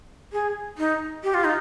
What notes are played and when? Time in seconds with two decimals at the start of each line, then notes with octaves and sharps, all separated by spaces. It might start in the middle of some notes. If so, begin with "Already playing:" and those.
0.32 G#4
0.78 D#4
1.23 G4
1.34 F4
1.44 D#4